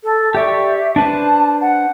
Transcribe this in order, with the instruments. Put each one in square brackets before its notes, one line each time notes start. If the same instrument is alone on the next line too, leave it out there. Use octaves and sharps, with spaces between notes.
[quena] A4
[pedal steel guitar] G4 D5 C#6 [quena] E5
[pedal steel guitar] D4 B4 C5 [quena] A5
[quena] F#5